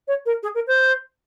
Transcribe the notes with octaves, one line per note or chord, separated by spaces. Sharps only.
C#5
A#4
G#4
A#4
C5